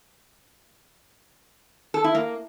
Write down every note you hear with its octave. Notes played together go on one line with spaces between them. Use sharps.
A4
E4
A#3